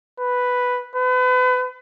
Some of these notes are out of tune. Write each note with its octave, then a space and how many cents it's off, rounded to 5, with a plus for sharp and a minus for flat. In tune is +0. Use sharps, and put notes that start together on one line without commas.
B4 +0
B4 +35